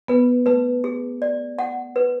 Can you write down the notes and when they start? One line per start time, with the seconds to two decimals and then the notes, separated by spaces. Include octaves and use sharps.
0.08 B3 B4
0.46 A3 B4
0.84 G#4
1.22 D5
1.59 F#5
1.96 B4